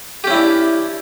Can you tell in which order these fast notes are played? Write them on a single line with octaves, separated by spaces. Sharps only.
G4 C#4 E4 D4